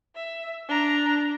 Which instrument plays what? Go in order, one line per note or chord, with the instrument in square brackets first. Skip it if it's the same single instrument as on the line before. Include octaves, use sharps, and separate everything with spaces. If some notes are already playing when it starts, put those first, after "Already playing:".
[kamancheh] E5
D4 A#5